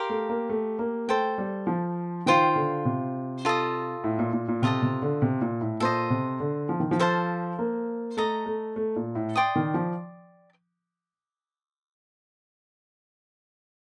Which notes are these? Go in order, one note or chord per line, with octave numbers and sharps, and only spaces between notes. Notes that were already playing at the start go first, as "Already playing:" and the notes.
Already playing: G4 A#4 F5 C6
A3
A#3
A3
A#3
A3 A4 C5 G5
G3
F3
D#3 F4 C5 G5
D3
C3
F4 A4 D#5
A2
A#2
A#2
A#2
C3 F4 A4 D#5 A5
C3
D3
C3
A#2
A2
A#2 A4 C5 D#5
C3
D3
F3
D#3
F3
A4 C5 F5 A5
A#3
A3 A4 D#5 A#5
A3
A3
A#2
A2
D5 G5 C6 D#6
D#3
F3